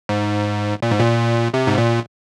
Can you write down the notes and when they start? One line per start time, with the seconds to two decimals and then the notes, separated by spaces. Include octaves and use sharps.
0.09 G#2
0.82 A#2
0.91 G#2
0.99 A#2
1.54 C3
1.67 G#2
1.78 A#2